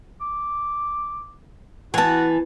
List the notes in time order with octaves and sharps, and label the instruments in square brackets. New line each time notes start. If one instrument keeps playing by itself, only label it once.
[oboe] D6
[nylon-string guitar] E3 B3 [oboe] F#4 [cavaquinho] G#5 A5